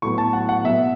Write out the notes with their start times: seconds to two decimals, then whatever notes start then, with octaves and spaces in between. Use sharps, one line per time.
0.02 A2 F#3 B3 C#6
0.18 A5
0.33 F#5
0.49 F#5
0.64 B2 F#3 B3 E5